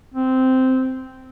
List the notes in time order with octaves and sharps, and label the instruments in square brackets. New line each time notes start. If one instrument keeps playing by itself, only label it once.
[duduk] C4